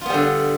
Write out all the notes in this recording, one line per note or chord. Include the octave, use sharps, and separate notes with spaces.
D3 G3 B3 F4